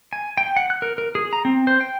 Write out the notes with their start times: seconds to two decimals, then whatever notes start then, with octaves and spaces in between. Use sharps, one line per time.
0.13 G#5
0.38 G5
0.56 F#5
0.70 F#6
0.82 A#4
0.98 A#4
1.15 G#4
1.33 A#5
1.45 C4
1.67 C5
1.81 G5